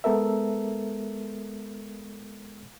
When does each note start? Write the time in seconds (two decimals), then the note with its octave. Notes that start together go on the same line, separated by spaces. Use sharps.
0.04 G#3 B3 A4 A#4 E5